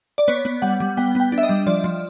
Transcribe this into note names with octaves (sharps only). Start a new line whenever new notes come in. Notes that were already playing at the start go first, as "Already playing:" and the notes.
D5
B3 C#5
B3
G3 F#5
G3
B3 G5
B3 G5
D4
E5
D#5
G3
F3 D5
F3